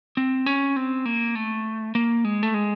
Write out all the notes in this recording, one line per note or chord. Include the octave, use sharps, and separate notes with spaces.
C4
C#4
C4
A#3
A3
A#3
G#3
A3
G#3